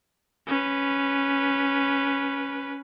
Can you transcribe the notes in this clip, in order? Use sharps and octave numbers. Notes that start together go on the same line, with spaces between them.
C#4 B4